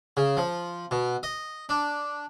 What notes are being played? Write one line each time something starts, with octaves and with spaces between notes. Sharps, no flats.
C#3
F3
B2
D#5
D4